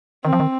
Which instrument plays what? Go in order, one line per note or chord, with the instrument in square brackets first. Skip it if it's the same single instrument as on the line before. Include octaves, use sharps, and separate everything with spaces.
[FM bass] D#3 [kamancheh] C4
[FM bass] F3
D#3